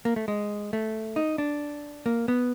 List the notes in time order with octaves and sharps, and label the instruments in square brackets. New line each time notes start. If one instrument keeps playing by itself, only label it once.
[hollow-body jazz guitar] A#3
A3
G#3
A3
D#4
D4
A#3
B3